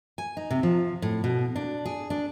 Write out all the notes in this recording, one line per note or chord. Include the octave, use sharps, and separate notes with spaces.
G#5
D#4
C3
F3
A2
B2
D4
G#4
D4